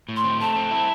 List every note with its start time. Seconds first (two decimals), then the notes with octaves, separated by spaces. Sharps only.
0.09 A2
0.16 C6
0.24 C4
0.40 A3 A5
0.56 C4
0.71 E4